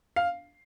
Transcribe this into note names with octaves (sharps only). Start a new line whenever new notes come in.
F5